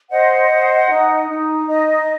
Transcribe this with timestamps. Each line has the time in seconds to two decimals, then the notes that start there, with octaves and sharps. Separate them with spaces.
0.10 C5 D#5 F#5
0.49 C5
0.90 D#4
1.29 D#4
1.68 D#4 D#5